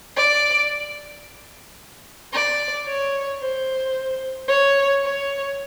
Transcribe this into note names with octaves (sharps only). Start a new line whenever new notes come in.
D5
D5
C#5
C5
C#5
C#5